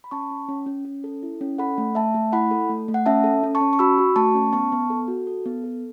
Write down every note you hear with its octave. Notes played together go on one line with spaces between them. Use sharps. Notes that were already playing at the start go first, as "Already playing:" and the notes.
B5
C#4 A5 C#6
C#4
C#4
C#4
C#4
A4
E4
C#4
A4 F#5 B5
A3
A3 E5 A5
A3
E4 F#5 B5
A4
A3
A3
F#5
C#4 E5 A5
A4
C#4
A5 C#6
C#4
C#6
F#4 B5 E6
F#4
A3 A5 C#6
C#4
B3 A5 C#6
B3
A4
F#4
A4
B3
A4